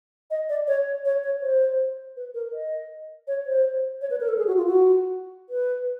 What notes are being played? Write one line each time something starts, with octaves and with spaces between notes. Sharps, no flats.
D#5
D5
C#5
C#5
C#5
C5
B4
A#4
D#5
C#5
C5
C#5
B4
A#4
A4
G#4
F#4
F4
F#4
B4